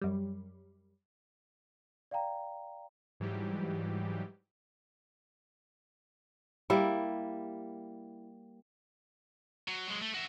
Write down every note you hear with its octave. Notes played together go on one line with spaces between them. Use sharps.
F#2 G3
D5 F5 G5 A#5
G#2 E3 F#3 G3 G4
G3 A#3 E4
F#3
F#3 G#3
A3
F#4 E5